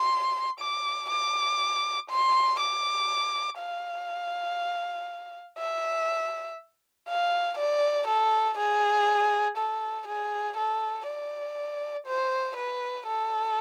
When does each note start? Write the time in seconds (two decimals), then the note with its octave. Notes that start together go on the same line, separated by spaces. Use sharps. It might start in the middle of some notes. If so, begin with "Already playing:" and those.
Already playing: C6
0.60 D6
1.10 D6
2.10 C6
2.60 D6
3.60 F5
5.59 E5
7.08 F5
7.58 D5
8.08 A4
8.58 G#4
9.58 A4
10.08 G#4
10.57 A4
11.08 D5
12.07 C5
12.57 B4
13.07 A4